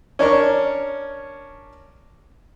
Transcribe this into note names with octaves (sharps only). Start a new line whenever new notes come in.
C#4 D4 A#4 C#6